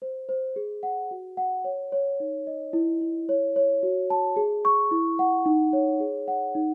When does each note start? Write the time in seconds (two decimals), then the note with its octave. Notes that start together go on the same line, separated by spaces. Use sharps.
0.02 C5
0.29 C5
0.56 G#4
0.83 F#5
1.11 F#4
1.37 F#5
1.64 C#5
1.92 C#5
2.20 D#4
2.47 D#5
2.73 E4
3.01 E4
3.29 C#5
3.56 C#5
3.83 F#4
4.10 A5
4.36 G#4
4.65 C#6
4.91 E4
5.19 F#5
5.46 D#4
5.73 C#5
6.00 G#4
6.28 F#5
6.55 D#4